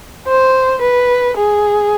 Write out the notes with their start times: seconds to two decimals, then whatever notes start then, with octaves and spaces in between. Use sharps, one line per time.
0.28 C5
0.82 B4
1.37 G#4